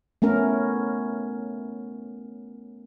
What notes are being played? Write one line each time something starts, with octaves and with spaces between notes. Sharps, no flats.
A3 B3 C#4 A#4